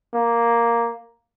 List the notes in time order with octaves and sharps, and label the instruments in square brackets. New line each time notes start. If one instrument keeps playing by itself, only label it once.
[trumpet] A#3